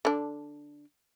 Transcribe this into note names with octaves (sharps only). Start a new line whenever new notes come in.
D3 D4